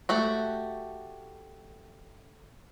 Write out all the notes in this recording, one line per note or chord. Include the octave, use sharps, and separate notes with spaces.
A3 F#4 G4